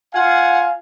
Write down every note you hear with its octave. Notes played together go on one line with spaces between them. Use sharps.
F4 F5 F#5 G#5